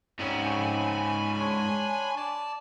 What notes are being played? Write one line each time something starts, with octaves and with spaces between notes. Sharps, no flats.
G#2 C4 C#4 G#5 B5
D4 C#5 C6
D5 A5